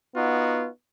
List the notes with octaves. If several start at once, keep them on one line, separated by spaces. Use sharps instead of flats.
B3 D#4 F4 F#4